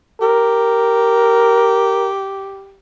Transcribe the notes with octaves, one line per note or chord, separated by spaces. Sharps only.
G4 A#4